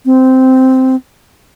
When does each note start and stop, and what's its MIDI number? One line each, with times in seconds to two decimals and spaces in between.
0.06 0.96 60